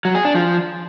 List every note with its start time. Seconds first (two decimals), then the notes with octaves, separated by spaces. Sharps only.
0.05 F#3
0.15 G#4
0.25 D4
0.35 F3